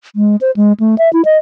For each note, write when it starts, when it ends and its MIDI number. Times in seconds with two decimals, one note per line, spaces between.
0.16 0.36 56
0.41 0.51 72
0.56 0.72 56
0.80 0.97 57
0.98 1.11 76
1.13 1.22 64
1.25 1.37 75